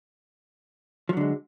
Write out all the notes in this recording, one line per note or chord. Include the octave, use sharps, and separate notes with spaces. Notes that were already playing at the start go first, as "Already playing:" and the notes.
D3 F3 F#3 G#3